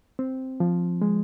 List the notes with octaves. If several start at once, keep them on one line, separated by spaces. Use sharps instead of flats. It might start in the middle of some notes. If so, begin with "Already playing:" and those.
C4
F3
G#3